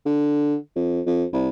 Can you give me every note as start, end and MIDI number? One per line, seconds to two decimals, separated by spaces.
0.06 0.56 50
0.76 1.01 41
1.06 1.25 41
1.33 1.49 36